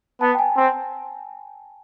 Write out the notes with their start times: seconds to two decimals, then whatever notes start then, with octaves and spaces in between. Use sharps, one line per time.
0.21 B3 A5
0.35 G5
0.39 G#5
0.57 C4